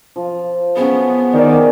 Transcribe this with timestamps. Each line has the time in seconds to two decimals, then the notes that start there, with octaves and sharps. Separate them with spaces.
0.16 F3
0.77 B3 C#4 G#4 B4
1.33 D#3 D5